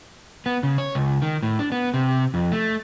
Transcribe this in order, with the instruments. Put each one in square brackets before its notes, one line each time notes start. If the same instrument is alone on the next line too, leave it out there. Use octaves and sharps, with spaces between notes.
[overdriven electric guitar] B3
C#3
C#5
C#2
D#3
A2
D4
B3
C3
F2
A3